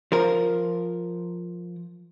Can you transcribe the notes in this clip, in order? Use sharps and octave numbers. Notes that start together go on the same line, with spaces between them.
F3 A#4